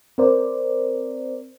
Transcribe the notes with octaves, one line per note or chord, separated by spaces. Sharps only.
C4 A#4 C5 D5